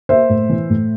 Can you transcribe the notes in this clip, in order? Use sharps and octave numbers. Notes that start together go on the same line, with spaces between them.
A#3 C5 E5
A2
E3
A2